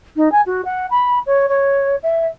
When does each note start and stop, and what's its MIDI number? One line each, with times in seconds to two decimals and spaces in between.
0.16 0.31 63
0.31 0.41 80
0.46 0.61 66
0.65 0.86 78
0.90 1.19 83
1.26 1.46 73
1.48 1.95 73
2.03 2.26 76